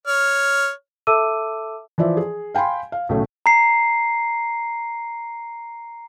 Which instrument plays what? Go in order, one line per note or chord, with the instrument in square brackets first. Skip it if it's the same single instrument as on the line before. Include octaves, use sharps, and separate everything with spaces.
[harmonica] C#5 F6
[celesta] A4 E5 A5 D6 E6 D#7
[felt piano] E3 F3 D5 E5
G#4
F5 G5 G#5 B5 C6
F5
B1 A2 C#3 A3
[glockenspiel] A#5 C7